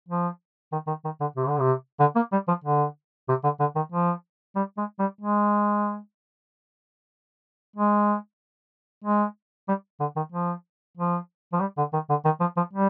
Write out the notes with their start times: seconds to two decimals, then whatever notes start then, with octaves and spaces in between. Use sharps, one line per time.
0.08 F3
0.72 D#3
0.87 D#3
1.04 D#3
1.20 D3
1.36 C3
1.48 D3
1.59 C3
2.00 D3
2.15 A#3
2.32 G3
2.48 F3
2.64 D3
3.29 C3
3.43 D3
3.60 D3
3.75 D#3
3.92 F3
4.55 G3
4.77 G#3
4.99 G3
5.21 G#3
7.76 G#3
9.04 G#3
9.68 G3
10.00 D3
10.16 D#3
10.32 F3
10.97 F3
11.52 F3
11.60 G3
11.77 D3
11.93 D#3
12.09 D3
12.25 D#3
12.40 F3
12.57 F3
12.73 G3